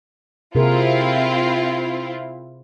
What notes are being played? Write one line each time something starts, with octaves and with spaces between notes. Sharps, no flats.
C3 C4 E4 F4 G#4 A#4